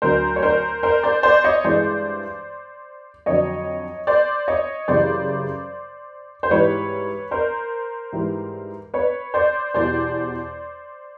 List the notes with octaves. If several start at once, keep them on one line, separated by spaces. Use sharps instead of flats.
D2 D3 F#3 A#4 C5
C#5
A#4 C5
A#4 C5
C5 D5
C5 D5
C#5 D#5
G2 E3 G#3 C5 D5
F2 D3 F#3 C#5 D#5
C5 D5
C#5 D#5
F#2 C#3 E3 G3 C5 D5
C5
G#2 E3 G3 B4 C#5
A#4 C5
G#2 E3 G3
B4 C#5
C5 D5
E2 B2 G3 C5 D5